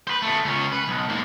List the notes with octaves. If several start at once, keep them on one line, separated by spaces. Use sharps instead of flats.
B4 C5
B2 A3
C#2 C#4
B4
B1
G#2 A#3